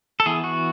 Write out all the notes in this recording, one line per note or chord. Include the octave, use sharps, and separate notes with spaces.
A4
E3 B3 G#4
F#4